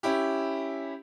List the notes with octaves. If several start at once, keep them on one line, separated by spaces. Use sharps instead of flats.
C#4 E4 G4